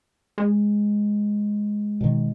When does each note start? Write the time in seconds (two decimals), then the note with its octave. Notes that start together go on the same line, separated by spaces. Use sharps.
0.38 G#3
2.01 B2 D#3